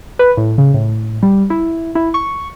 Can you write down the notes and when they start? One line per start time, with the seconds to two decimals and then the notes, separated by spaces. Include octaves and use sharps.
0.19 B4
0.37 A2
0.58 C#3
0.74 A2
1.23 G3
1.50 E4
1.95 E4
2.14 C#6